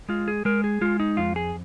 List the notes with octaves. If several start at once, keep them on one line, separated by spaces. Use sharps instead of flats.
G#3 F4
G#4
G#3 A#4
G#4
G#3 F4
D#4
F2 F4
G#4